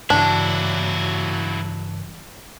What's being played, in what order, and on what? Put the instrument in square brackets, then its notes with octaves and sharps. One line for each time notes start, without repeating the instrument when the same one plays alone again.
[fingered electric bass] G2 C#3 E3 [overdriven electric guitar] F#3 E4 [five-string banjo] D4